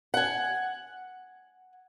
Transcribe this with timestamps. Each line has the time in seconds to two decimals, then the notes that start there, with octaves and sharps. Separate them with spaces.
0.14 F#5 G#5